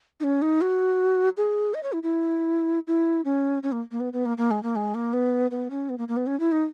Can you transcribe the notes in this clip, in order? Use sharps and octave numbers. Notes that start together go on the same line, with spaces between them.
D#4
C#4
D#4
F#4
G#4
D#5
C#5
E4
E4
E4
C#4
C#4
A#3
A#3
B3
B3
A#3
A#3
G#3
A#3
G#3
A#3
B3
B3
C#4
B3
A#3
A#3
B3
C#4
E4
D#4